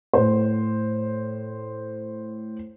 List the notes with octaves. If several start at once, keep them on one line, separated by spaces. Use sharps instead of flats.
A2 C5